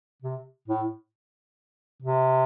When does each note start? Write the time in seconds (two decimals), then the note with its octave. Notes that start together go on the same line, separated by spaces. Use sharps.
0.22 C3
0.68 A2
2.02 C3